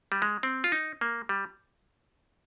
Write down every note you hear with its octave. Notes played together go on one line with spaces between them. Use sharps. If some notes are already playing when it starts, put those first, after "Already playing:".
G3
G#3
C4
F4
D#4
A#3
G3